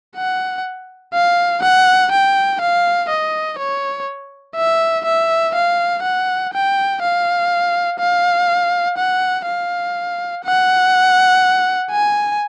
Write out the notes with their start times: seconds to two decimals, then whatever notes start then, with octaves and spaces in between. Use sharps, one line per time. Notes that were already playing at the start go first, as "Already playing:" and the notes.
0.16 F#5
1.14 F5
1.63 F#5
2.12 G5
2.61 F5
3.10 D#5
3.59 C#5
4.56 E5
5.06 E5
5.55 F5
6.03 F#5
6.53 G5
7.02 F5
8.00 F5
8.98 F#5
9.47 F5
10.45 F#5
11.91 G#5